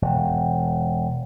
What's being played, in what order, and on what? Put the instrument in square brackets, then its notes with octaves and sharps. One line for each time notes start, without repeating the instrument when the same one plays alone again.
[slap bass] E1